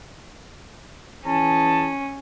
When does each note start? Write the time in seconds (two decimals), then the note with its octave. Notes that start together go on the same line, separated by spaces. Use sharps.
1.25 E3 C#4 G#4 A5